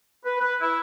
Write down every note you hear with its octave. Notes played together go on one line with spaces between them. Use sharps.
B4
B4
E4